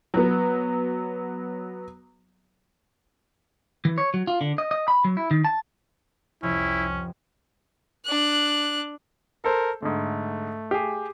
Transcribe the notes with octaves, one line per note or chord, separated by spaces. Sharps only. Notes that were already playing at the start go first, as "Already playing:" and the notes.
F#3 B3
E3
C#5
F#3
F4
D3
D#5
D#5
B5
F#3
E4
D#3
A5
F1 C2 F2 F3 C#4 E4
D4 F#6
A4 A#4 C5
G#2 D3 A3
G4 G#4